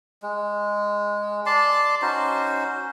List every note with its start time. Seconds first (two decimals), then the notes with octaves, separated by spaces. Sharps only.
0.23 G#3
1.46 D5 A5 C6
2.02 C#4 D#4 F#4 C5